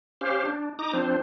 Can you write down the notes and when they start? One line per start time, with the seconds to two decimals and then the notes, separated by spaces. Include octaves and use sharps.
0.21 C#4 G4 C5 F5
0.45 D4
0.79 D#4 A#5 D6 D#6
0.93 F3 C4 D4 C5